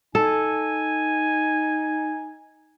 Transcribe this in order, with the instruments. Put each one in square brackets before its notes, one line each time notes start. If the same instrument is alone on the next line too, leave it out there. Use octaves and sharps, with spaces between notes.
[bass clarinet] D#4 [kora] A4 [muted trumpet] G#5